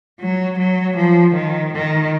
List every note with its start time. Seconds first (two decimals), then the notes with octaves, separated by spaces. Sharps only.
0.21 F#3
0.58 F#3
0.96 F3
1.34 D#3
1.73 D#3